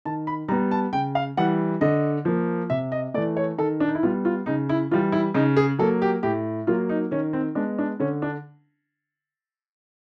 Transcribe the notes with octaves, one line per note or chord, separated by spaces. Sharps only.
D#3 A5
B5
G3 B3 A#5
A5
C#3 G5
F5
E3 G3 F#5
D3 D#5
F3 A#3
C3 E5
D#5
E3 A3 D5
C#5
D#3 A4
D4
D#4
E4
G3 B3 F4
F4
C#3 D#4
E4
E3 G3 F4
E4
C#3 D#4
G#4
F#3 A#3 A4
G4
A2 G4
F#3 A#3 F4
D#4
D#3 C#4
C4
G#3 B3 D4
D4
D3 C#4
D4